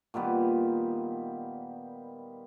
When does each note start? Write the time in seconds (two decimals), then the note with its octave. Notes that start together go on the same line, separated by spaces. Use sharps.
0.14 A#2 D#3 G3 B3